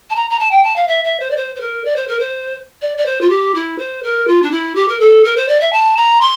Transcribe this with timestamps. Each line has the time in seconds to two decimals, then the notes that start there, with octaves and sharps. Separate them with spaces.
0.10 A5
0.15 A#5
0.30 A#5
0.39 A5
0.51 G5
0.63 A5
0.76 F5
0.87 E5
1.04 E5
1.20 C5
1.31 D5
1.37 C5
1.55 C5
1.60 A#4
1.85 D5
1.96 C5
2.08 A#4
2.19 C5
2.82 D5
2.97 D5
3.06 C5
3.21 F4
3.30 G4
3.54 E4
3.78 C5
4.03 A#4
4.27 F4
4.42 D4
4.51 E4
4.75 G4
4.88 A#4
5.00 A4
5.24 A#4
5.36 C5
5.48 D5
5.60 E5
5.72 A5
5.97 A#5
6.21 C6